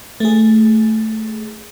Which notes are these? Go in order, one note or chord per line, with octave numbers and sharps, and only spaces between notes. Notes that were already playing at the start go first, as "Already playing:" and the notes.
A3 G#4